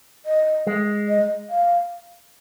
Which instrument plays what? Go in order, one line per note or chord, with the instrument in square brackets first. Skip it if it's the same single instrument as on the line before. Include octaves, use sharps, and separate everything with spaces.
[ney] D#5
[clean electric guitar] G#3
[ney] D#5
F5